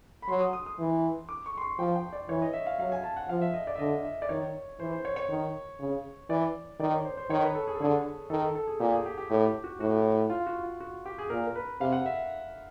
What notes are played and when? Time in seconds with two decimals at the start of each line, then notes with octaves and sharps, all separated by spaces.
0.22 B5
0.29 F#3 C6
0.41 D#6
0.53 D#6
0.66 D#6
0.79 E3
1.29 D6
1.46 C#6
1.57 C6
1.62 C#6
1.79 F3 G5
1.95 G5
2.13 D5
2.29 E3 C#5
2.42 D#5
2.53 E5
2.67 F5
2.79 F#3 F5
2.92 G#5
3.03 A5
3.17 F#5
3.29 F3 F5
3.41 E5
3.54 D#5
3.67 D5
3.75 E5
3.79 D3 D#5
4.04 E5
4.22 D5
4.29 D#3 C#5
4.80 E3 C5
4.92 C5
5.05 C#5
5.16 C#5
5.29 D#3
5.79 C#3
6.29 E3 D5
6.79 D#3 D5
6.92 C#5
7.05 C5
7.17 C5
7.30 D#3 C#5
7.42 B4
7.55 A4
7.68 G#4
7.75 A4
7.80 D3 G#4
8.30 D#3 A4
8.42 A4
8.55 A4
8.67 G#4
8.80 A#2 G4
8.92 G#4
9.06 G4
9.18 G4
9.30 A2 G4
9.46 G4
9.64 F#4
9.80 A2 F#4
10.30 F4
10.47 F#4
10.64 F4
10.80 F#4
11.06 G4
11.18 G#4
11.30 A#2 A#4
11.47 A#4
11.55 B4
11.80 C3 F5
11.92 F#5
12.06 E5